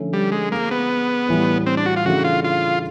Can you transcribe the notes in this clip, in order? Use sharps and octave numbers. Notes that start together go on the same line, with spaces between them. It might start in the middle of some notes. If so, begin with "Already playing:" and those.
Already playing: D3 F3 A3 C#4 E4
G3
G#3
G#3 A#3 C4 E4
B3
A2 E3 G3
C4
D4
F#4
F4
C#3 E3 A3 D4 F#4
F4
F4